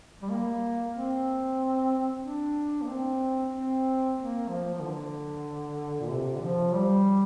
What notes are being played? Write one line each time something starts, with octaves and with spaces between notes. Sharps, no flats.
G3
A#3
C4
D4
A#3
C4
C4
A#3
F3
F3
D3
A#2
C3
D3
F3
G3